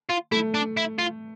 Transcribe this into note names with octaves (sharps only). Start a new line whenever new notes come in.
F4
A3 E4
D4
E4
F4